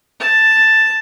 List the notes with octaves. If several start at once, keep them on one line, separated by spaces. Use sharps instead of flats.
A5